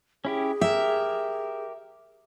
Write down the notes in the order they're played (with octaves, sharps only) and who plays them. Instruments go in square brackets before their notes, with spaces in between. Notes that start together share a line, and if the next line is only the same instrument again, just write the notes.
[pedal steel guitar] C#4 E4 G4 [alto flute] G#4
[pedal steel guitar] G4 A#4 [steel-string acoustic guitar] E5